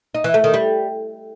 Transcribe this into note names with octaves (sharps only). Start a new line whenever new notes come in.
D#4
E3
A3
D#3
G3